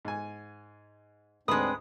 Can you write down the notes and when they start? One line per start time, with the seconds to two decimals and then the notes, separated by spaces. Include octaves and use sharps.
0.05 G#2 G#5
1.48 D2 G#2 G#3 C4 D4 A#4 B4 D#6